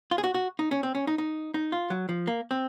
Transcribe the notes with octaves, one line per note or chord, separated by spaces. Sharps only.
F4
G#4
F#4
F#4
D#4
C#4
C4
C#4
D#4
D#4
D#4
F4
F#3
F3
A#3
C4